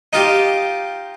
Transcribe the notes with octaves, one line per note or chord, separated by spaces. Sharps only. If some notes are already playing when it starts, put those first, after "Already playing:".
D#4 F4 G4